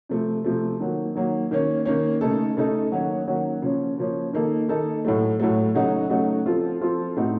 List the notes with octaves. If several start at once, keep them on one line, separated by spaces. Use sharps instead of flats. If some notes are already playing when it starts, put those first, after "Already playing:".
C3 F3 A3
C3 F3 A3
D#3 F#3 A#3
D#3 F#3 A#3
D#3 A#3 C#4
D#3 A#3 C#4
C#3 A3 D#4 A4
C#3 A3 D#4 A4
D#3 F#3 A#3 C#4 F#4
D#3 F#3 A#3 C#4 F#4
C#3 F3 A#3 C#4
C#3 F3 A#3 C#4
D#3 A#3 D#4 A4
D#3 A#3 D#4 A4
A2 F#3 A3
A2 F#3 A3
C#3 F#3 A3 D#4 F#4
C#3 F#3 A3 D#4 F#4
F3 C4 F4 A4
F3 C4 F4 A4
A2 A3 C4 D#4 F#4